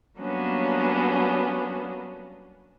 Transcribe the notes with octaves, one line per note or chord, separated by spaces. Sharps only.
F#3 G3 A#3 B3 C#4 D4